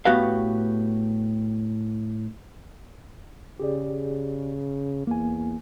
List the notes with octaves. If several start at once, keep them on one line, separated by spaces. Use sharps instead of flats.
A2 B3 F#4 G4 B4 F5
C#3 G4 G#4 D5
E2 A#3 G#5